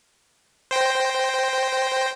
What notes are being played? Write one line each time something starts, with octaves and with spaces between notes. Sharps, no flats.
C5 G5 A#6